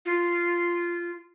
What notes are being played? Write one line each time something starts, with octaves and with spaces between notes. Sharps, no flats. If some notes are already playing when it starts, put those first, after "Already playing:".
F4